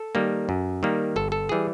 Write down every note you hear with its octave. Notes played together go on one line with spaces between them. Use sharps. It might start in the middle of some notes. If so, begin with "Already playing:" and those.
Already playing: A4
D#3 G3 A#3
F#2
D#3 G3 A#3
G1 A4
A4
E3 G3 G#4